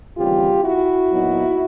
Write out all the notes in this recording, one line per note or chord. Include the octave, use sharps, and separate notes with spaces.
D#2 C#3 E3 G3 C4 F4 G4
E4 F#4
A#2 F#3 B3 D#4